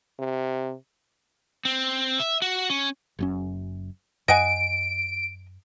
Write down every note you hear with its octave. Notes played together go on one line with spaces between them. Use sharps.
C3
C4
E5
F#4
C#4
F#1 F#2 C#4
F#2 D#5 F#5 G#5 D7